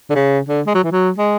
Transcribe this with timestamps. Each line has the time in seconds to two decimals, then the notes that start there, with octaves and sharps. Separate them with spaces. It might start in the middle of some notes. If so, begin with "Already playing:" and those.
0.10 D3
0.15 C#3
0.49 D3
0.67 G#3
0.75 F#3
0.84 E3
0.92 F#3
1.18 G#3